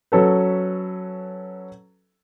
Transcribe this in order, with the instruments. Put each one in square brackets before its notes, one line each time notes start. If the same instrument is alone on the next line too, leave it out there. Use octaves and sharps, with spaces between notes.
[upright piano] F#3 C#4 A4 B4